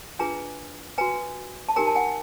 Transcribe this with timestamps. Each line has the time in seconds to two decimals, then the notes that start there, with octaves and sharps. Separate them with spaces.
0.19 D4 F4 G#4 B4 G#5 A#5
0.98 F#4 B4 G#5 A#5
1.69 A5
1.76 D#4 G4 A#4 G#5 A#5
1.87 A5
1.95 F#5 G#5